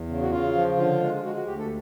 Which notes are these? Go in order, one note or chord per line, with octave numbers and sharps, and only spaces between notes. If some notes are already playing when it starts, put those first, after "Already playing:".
Already playing: E2
C#3
F#4
C#3 F4
F3
D3 F4
G#3
G#3 F#4
F#4
D2 G4
A4